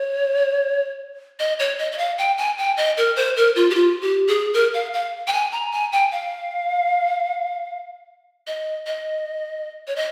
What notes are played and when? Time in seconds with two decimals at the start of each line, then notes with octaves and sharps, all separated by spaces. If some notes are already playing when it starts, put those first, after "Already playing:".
Already playing: C#5
1.39 D#5
1.59 C#5
1.79 D#5
1.92 D#5
1.98 F5
2.18 G5
2.38 G#5
2.58 G5
2.77 D#5
2.97 A#4
3.16 C5
3.37 A#4
3.56 F4
3.70 G4
3.75 F4
4.02 G4
4.28 G#4
4.54 A#4
4.74 F5
4.93 F5
5.27 G5
5.33 G#5
5.52 A#5
5.72 G#5
5.92 G5
6.12 F5
8.47 D#5
8.87 D#5
9.87 C#5
9.96 D#5